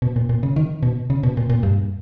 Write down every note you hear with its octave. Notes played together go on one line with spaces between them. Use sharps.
B2
A#2
A#2
C#3
D#3
B2
C#3
B2
A#2
A#2
G2